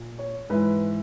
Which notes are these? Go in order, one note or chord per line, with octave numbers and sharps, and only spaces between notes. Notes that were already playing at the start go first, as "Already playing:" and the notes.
Already playing: A#2
C#5
G#2 E3 B4